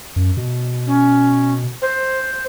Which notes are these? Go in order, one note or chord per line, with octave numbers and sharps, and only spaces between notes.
F#2
B2
C#4
C5